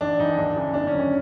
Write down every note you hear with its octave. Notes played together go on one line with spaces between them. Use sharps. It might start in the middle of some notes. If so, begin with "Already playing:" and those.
A1 D4
G#2 E3 D#4
D#2 D4
C#3 E3
G1 D4
C#4
F#2 D#3
C#4